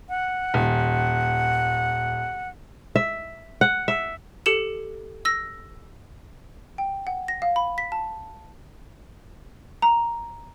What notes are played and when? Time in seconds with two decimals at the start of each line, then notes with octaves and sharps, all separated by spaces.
0.09 F#5
0.54 D#1
2.96 E5
3.61 F#5
3.88 E5
4.46 G4 A4 C#7 E7
5.25 E6 A#6
6.78 G5
7.07 F#5
7.28 A#6
7.42 F5
7.56 B5
7.78 B6
7.92 A5
9.82 A#5